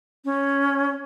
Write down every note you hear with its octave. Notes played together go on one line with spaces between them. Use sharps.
C#4